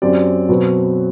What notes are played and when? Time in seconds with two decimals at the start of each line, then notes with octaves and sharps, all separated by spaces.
0.02 F#2 F#3 C4 G4 D5
0.49 B2 F#3 C4 F#4 B4